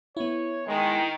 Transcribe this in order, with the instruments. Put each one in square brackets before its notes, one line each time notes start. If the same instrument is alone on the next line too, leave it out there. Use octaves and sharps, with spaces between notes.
[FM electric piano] B3 E4 [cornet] C#5
[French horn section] D#3 [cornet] G#3